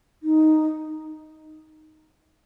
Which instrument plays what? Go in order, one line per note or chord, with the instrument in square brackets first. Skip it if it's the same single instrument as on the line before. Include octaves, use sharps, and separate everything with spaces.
[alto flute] D#4